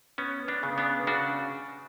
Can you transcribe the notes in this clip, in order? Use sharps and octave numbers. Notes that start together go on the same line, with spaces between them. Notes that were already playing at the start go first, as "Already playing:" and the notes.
B3 C#4
B3 D4
C#3
B3 D4
C#3 D4 F#4